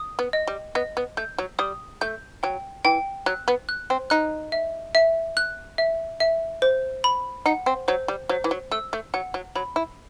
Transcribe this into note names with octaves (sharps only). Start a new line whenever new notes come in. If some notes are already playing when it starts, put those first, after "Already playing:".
Already playing: D#6
B3
D#5
G3
B3 D#5
B3
A3 G6
F#3
G3 D#6
A3 G6
F#3 G5
E3 G5
F#3 F#6
B3
F#6
C4
D#4 F#6
E5
E5
F#6
E5
E5
C5
B5
D#4 F#5
C4
F#3 C5
G3
F#3 C5
E3
F#3
A3 E6
A3
F#3 F#5
F#3
F#3 B5
E4